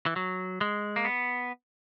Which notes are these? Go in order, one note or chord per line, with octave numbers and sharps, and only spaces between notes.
E3
F#3
G#3
A#3
B3